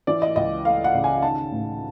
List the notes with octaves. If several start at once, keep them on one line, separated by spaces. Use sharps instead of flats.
E3 D5
D#5
C#2 D#5
A3 F5
F#5
C#3
G#5
D#3 A5
A1